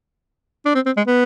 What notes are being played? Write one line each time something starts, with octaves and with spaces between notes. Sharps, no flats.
D4
C4
C4
G#3
B3